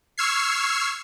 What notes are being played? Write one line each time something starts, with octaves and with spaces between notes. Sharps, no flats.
C#6 E6 F6 G#6 C7